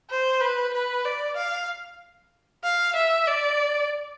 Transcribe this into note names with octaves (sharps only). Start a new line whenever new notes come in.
C5
B4
B4
D5
F5
F5
E5
D5